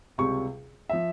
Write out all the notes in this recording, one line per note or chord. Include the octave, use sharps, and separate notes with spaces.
C#2 C3 G3 C#6
F3 E5